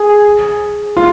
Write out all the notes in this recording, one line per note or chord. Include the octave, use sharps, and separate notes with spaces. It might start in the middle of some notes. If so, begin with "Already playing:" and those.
Already playing: G#4
F4